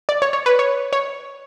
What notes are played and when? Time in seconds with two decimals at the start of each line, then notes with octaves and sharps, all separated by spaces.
0.09 D5
0.22 C#5
0.33 C#5
0.46 B4
0.59 C#5
0.93 C#5